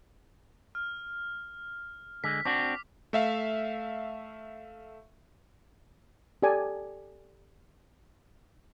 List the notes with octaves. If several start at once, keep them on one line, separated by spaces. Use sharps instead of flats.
F6
D3 G#3 B6
C4 D4 F#4 D6
A3 E5 F5
G4 A4 D5 G#5